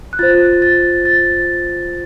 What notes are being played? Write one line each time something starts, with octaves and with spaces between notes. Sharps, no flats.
F#6
F4 C5 A6
A6
A6